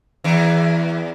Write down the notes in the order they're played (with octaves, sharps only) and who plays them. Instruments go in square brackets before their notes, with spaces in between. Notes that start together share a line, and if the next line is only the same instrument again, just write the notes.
[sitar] E2 E3